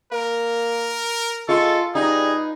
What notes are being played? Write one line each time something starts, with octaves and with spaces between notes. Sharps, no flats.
A#3 A#4
G#3 F4 A4 C#6
G3 D#4 G#4 B4